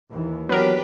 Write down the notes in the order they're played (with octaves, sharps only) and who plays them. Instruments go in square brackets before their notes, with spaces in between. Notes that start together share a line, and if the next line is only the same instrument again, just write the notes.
[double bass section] D#2 E3
[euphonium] F#3 [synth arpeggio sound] B3 A#4 [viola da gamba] D4 G4 B4